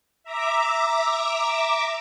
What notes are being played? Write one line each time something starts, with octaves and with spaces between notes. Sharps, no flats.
E5 A#5 D6